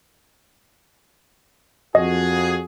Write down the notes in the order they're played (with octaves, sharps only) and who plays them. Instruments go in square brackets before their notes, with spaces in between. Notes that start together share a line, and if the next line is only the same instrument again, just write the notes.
[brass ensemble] F2 F#4 G#4 [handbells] D#5